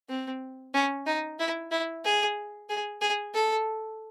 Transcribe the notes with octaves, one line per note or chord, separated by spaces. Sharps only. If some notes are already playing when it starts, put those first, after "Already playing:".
C4
C#4
D#4
E4
E4
G#4
G#4
G#4
A4